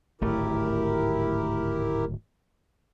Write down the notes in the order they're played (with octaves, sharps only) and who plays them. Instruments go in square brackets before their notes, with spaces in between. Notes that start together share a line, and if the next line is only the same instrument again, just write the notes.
[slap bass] D1 G#1 A3 [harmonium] E4 G4 A#4